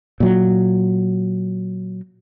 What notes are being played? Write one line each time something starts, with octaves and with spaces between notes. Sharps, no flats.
A#2 F#3